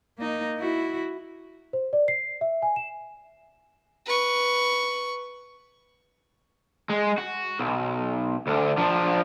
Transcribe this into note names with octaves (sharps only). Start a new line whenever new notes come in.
A#3 D#4
E4 F#4
C5
D5
C7
E5
G#5
E7
B4 C#6
G#3
F#4
B1
D2 D3
F3 D4